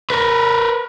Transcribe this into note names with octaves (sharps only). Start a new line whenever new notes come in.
A#4 B4